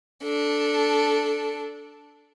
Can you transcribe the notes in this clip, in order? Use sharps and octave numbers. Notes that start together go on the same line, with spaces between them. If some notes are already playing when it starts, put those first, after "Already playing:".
D4 A4